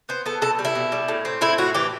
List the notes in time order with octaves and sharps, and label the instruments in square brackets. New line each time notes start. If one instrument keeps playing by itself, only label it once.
[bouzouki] B3 C5
B3 A4
B2 A4
G3
E4
B2
G3
A2
C4
A2 E4
A2 F#4
E3 G4